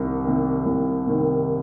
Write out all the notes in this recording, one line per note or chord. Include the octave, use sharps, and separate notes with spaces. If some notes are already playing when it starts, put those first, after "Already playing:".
Already playing: C2 C3 D#3
C3 D#3
C2
C3 D#3